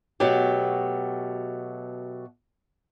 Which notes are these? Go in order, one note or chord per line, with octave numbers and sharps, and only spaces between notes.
B2 F#3 A3 G4